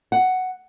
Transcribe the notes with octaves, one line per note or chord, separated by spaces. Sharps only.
F#5